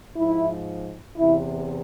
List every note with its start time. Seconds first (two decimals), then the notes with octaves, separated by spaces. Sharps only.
0.16 G#2 F3 E4
1.17 E2 C3 E3 E4